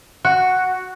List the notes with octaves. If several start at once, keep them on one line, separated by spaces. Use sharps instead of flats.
F#4